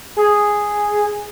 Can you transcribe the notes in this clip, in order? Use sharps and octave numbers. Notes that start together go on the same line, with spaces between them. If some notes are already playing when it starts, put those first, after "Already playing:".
G#4